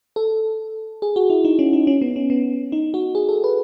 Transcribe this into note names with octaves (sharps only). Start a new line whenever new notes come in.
A4
G#4
F#4
E4
D#4
C#4
D#4
C#4
B3
C#4
B3
D#4
F#4
G#4
A4
B4